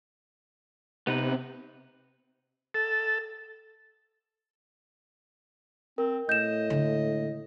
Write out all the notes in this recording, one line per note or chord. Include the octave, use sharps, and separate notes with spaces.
C3 B3 D#4 B4
A4
C4 A#4
A2 D#5 G6 E7
D3 G#3